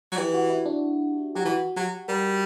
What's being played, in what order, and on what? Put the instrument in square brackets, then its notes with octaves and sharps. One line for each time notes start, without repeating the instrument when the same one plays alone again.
[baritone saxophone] F#3
[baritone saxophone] E3 [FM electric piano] G4
[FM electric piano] F#4
E4
D4
[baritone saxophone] F#3 [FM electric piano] G4
[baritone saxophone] E3 [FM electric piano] F#4
[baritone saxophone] F#3 [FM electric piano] G4
[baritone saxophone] G3 [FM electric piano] A#4